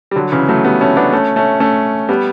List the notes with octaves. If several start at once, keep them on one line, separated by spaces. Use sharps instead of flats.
G3
D3 F#3
C#3 E3
F#3 A3
G3 B3
A3 C#4
B3 D4
A3 C#4
A3 C#4
A3 C#4
G3 B3